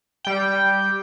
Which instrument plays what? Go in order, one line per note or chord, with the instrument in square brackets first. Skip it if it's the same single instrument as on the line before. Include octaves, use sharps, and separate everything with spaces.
[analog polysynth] G3 G5